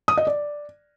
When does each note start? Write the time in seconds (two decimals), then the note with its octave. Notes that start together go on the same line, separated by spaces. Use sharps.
0.08 D#6
0.17 D#5
0.27 D5